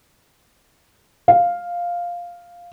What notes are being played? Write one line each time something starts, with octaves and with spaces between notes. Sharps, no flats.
F5